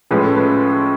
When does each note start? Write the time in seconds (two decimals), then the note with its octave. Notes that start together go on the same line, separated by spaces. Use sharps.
0.11 A2 F3 G#3 C#4 B4
0.23 A4
0.36 B4